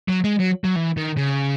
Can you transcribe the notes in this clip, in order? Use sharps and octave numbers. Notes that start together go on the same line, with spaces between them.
F#3
G#3
F#3
F#3
E3
D#3
C#3